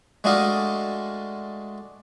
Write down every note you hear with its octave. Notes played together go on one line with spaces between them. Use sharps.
G#3 A3 D4 F#4 D#5 F5